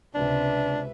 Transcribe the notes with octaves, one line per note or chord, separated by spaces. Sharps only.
C#2 C3 D4 B4 E5